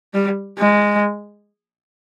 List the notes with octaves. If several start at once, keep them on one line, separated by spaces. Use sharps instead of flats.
G3
G#3